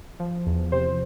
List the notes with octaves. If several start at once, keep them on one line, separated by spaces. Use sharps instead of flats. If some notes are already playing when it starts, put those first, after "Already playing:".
F3
E2
C3 C5